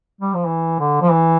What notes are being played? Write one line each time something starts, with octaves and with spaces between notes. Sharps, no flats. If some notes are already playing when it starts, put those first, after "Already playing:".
G3
F3
E3
D3
F3
E3